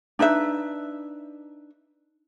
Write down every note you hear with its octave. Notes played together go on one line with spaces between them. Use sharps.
D4 D#4 B4 E5